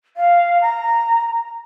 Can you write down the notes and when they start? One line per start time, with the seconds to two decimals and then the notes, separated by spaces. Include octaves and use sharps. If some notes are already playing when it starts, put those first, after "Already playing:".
0.17 F5
0.62 A#5